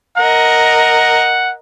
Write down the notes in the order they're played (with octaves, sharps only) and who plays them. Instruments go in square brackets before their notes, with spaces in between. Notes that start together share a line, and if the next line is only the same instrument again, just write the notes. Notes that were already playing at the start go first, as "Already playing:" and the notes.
[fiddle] A#4 D#5 [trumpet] F#5